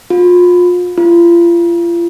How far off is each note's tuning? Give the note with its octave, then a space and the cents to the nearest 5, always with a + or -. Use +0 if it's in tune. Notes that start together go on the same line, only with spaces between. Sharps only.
F4 +30
F4 -35